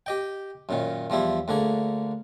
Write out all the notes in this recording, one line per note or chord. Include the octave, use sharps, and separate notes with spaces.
G4 D#5 G5
F#2 A#2 D#3
E2 F3 G3 E4
D2 D3 A#3 G#4